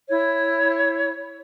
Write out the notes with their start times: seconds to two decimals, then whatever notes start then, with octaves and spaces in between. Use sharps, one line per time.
0.09 E4 C#5